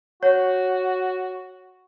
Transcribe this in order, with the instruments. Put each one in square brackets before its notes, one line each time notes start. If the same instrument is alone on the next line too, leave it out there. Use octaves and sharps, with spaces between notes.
[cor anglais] F#4 [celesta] C#5